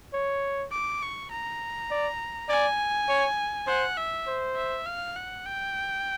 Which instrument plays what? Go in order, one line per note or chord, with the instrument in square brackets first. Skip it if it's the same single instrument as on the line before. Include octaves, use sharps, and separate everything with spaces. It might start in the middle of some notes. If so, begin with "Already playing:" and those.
[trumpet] C#5
[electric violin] D6
C#6
A#5
[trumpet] D5
[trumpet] D5 [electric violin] G#5
[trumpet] C#5
[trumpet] C5 [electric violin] F#5
[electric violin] E5
[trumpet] C5
[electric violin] E5
F5
F#5
G5